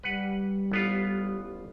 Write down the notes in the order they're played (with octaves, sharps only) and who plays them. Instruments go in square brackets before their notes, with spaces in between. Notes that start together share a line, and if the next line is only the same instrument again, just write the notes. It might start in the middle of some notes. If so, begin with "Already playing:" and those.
[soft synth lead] G3 [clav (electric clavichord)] B4 F#5
[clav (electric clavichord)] A1 B3 F4